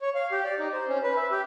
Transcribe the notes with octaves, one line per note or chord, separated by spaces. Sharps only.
C#5
F5
G4
D5
D#4
C5
C#4
B4
E5
G4